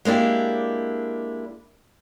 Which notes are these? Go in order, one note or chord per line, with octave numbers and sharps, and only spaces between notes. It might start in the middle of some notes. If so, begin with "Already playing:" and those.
G#3 A#3 D4 E4 G4